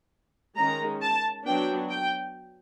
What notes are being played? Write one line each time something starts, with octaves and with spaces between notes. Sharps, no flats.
D#3 G#3 C#4 A#5
A5
F#3 B3 D4 G5
G5